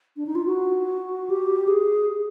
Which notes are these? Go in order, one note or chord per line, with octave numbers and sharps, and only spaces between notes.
D4
D#4
F4
F#4
G4
G#4